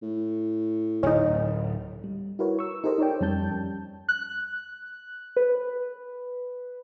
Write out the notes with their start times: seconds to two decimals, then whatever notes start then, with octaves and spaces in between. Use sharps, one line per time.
0.02 A2
1.03 D1 C#4 D#4
2.04 G3
2.39 E4 F#4 A#4 B4 C#5
2.59 C#6 E6
2.84 D#4 G4 A4 A#4 C5 D#5
2.98 D#4 A#4 C#5 D5 G5
3.20 F2 G3 C#4 A5 G6
4.09 F#6
5.36 B4